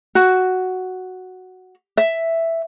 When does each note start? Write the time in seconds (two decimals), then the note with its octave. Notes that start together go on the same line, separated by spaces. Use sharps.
0.15 F#4
1.97 E5